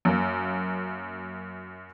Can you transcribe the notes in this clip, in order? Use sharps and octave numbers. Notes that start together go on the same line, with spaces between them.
F#2 A#3